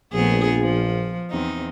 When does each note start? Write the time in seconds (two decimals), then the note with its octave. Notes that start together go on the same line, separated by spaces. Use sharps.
0.13 A#1 A3 B3 G#4
0.59 F3
1.30 E2 C4 D#4